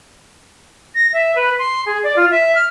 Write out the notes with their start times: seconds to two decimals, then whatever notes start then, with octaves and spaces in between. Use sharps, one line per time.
0.94 A#6
1.12 E5
1.35 B4
1.58 C6
1.85 G#4
2.03 D5
2.16 F4
2.30 E5
2.55 F6